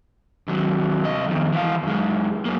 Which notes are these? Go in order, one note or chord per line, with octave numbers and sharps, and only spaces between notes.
D#2 F#3
C2 D#5
F2 D#3
E3 F5
F#2 G#3
F#2 A#3